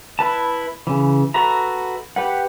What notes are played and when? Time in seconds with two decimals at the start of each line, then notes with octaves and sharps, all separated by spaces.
0.19 E4 B4 A5
0.87 C#3 E3
1.34 F#4 A4 B4 E5 A#5
2.16 G4 B4 F#5